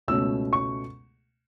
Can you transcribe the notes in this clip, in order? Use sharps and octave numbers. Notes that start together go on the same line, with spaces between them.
C#2 B2 A3 C#4 E6
C#6